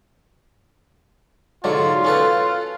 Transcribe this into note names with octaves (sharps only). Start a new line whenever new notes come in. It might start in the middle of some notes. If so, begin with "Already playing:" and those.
G#2 D3 F#3 F4
C#4 A4 B4